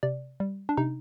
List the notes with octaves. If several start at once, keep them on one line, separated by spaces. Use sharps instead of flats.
C3 D5
G3
D4
C3 D#4